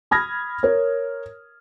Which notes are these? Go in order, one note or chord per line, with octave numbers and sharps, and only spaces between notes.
B5 D#6 F6 G#6 A#6
A#4 C#5